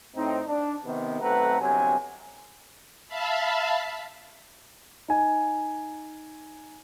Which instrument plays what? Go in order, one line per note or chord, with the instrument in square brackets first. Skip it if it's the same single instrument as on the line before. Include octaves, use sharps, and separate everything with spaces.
[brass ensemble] A2 C4 D#4
D4
C3 D#3 B3
B1 A3 C4 B4 F#5 A#5
G1 C3 F#3 G#5
[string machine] E5 F5 A5 B5
[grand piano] D#4 G#5